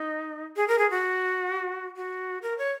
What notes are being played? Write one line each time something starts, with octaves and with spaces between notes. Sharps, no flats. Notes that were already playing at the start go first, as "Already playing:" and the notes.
Already playing: D#4
G#4
A#4
G#4
F#4
F#4
A#4
C#5